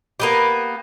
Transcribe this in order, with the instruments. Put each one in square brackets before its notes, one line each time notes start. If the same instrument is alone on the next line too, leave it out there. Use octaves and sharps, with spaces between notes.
[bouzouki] A#3 B3 G4